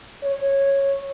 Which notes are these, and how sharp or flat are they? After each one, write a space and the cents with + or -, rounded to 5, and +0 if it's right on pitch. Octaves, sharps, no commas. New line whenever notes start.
C#5 -10